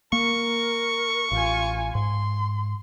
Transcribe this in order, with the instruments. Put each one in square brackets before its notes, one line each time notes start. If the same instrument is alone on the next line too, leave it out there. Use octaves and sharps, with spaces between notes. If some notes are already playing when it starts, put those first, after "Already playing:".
[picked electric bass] A#3 [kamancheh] A#4 [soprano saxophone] C#6
[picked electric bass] A1 [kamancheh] F4 G#5
[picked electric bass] G#2 [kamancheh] C6